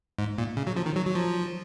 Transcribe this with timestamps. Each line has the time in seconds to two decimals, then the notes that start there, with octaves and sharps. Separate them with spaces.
0.19 G#2
0.38 A#2
0.57 C#3
0.67 F#3
0.77 F3
0.86 D#3
0.96 F#3
1.06 F#3
1.15 F3